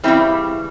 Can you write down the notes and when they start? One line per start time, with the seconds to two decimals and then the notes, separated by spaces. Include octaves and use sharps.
0.03 C#3 E3 G3 C4 E4